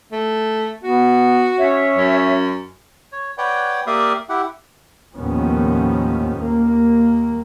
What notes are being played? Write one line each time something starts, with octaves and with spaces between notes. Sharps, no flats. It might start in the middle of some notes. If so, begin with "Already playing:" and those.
A3
B3 F#4
C#4 C#5 E5
F#2
C#5
B4 C#5 D5 F#5 G5
A#3 G4 D5 E5 F5 D#6
E4 G4 F#5
D#2 A2 D#3 F3 B3 C#4
D#2 A#3